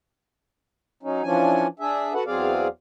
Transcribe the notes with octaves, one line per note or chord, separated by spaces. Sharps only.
F#3 C#4 D#4
E3 F3 C#4 D4 G#5
D4 G#4 E5
F#4 A4 B4 F#5
E2 F#3 C4 G#4 D5 F5